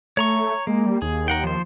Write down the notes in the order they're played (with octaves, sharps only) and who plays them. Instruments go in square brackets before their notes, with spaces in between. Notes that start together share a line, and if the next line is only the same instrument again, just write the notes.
[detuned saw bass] A3 [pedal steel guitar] C#5 A#5 C#6
[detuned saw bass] G#3 [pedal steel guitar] A#3
[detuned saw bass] G3
[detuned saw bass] D#2 [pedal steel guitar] G#4
[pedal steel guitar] A#4 F#5 G5
F3 C5